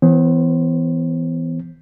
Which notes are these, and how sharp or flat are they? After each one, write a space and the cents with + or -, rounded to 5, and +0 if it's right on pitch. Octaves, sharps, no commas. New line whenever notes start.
E3 +0 B3 +30 C5 +45